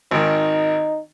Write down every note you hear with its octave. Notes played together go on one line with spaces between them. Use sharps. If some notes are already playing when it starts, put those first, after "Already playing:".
G#1 D#3 D#4